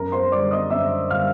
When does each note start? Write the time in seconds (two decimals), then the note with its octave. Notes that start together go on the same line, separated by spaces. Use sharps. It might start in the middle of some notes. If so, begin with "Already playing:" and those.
Already playing: F#2 A#4 A#5
0.12 C5 C6
0.32 D3 G3 D5 D6
0.51 D#5 D#6
0.70 F#2 E5 E6
1.10 D3 G3 F5 F6